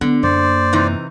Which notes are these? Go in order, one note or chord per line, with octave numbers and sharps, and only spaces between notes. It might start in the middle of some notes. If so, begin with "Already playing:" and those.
D3 B3
F#2 A#3 C5 D5
C3 E3 D#4